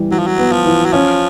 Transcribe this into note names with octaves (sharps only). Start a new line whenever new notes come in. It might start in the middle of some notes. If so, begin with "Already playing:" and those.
Already playing: E3 G3
E3 F#3
F3
F#3
B3
F3
E3
F#3
F3 C#4